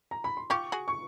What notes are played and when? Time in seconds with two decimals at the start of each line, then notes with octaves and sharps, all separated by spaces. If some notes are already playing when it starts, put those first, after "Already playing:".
0.11 A#5
0.24 B5
0.37 C6
0.50 F4 G4 C#6
0.72 F#4 G#4
0.88 C#6